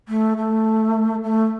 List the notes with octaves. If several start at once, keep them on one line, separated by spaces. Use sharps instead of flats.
A3
A3
A3